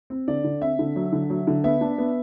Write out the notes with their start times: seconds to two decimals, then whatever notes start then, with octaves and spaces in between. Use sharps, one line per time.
0.10 C4
0.28 D3 D5
0.44 D3
0.61 C4 E5
0.79 D3
0.96 F#3
1.13 D3
1.30 F#3
1.47 D3
1.64 B3 E5
1.81 D4
1.98 B3